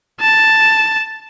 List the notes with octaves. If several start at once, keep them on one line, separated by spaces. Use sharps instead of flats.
A5